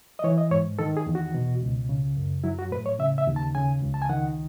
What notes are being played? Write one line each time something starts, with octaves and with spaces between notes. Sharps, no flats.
D#5
E3 C#5
D#5
G#2 C#5
D#3 A4
G#4
E2
F#4
B2
C#2
C#3
F#2
F#3 E4
F#4
A2 B4
C#5
C#3 E5
E5
D#2
A5
C#3 G#5
C#2
A5
G#5
D#3 F#5